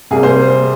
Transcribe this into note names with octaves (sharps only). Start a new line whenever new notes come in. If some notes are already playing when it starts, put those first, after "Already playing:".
C3 G3 A#3 G#4
C5